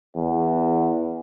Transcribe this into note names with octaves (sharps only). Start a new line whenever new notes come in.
E2